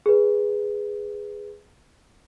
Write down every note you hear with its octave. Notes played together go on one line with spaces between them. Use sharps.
G#4 B4